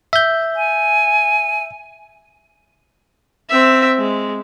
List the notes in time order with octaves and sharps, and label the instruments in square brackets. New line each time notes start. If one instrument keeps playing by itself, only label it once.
[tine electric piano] E5 G6
[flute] G#5
[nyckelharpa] C4 E5
G#3